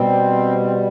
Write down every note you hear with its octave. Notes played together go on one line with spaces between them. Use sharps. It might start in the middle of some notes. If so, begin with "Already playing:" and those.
Already playing: B2 G3 C4
D4
C4